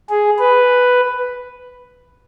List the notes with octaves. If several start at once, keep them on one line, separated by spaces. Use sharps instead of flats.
G#4
B4